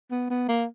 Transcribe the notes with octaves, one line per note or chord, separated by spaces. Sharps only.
B3
B3
A#3